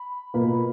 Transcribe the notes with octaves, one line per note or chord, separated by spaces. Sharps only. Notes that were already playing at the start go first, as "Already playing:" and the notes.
Already playing: B5
B2 A#3 F4 B4 B5